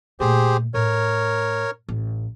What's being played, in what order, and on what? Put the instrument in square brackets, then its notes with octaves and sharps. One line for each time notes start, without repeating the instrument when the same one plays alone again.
[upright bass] A#2 A3 [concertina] G4 G#4 C5
[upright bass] A2 [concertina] A#4 C#5
[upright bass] A1